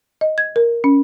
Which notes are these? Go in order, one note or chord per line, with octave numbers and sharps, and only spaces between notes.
D#5
G#6
A#4
C#4